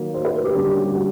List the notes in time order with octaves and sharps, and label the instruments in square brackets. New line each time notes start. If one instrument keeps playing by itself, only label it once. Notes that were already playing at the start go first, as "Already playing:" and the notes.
Already playing: [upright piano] D#3 F#3 A#3
C5
B4
A#4
G4
D3 G3 A#3 C#4
G4
F#4
G4
F#4